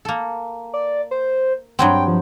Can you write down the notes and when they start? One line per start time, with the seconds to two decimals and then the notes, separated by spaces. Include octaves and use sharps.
0.05 A#3 A4
0.74 D5
1.11 C5
1.79 G2 F#3 C4 G5
2.08 F3